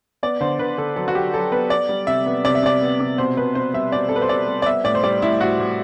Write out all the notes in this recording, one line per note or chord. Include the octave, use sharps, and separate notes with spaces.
B3 D5
D3 C5
D3 B4
D3 A4
F#3 A4
F#4
F#3 G4
F#3 A4
B3 B4
B3 D5
G3
C3 E5
B3
C3 D5
E5
C3 D5
B3
C3
B2 C5
B2 B4
B2 C5
G3 E5
B2 D5
B2 A4
B4
C5
B2 D5
G3
D5
B3 E5
A2 D5
C5
G3 D5
A2 E4
A2 F#4
A2